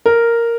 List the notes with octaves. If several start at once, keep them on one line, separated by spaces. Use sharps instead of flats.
A#4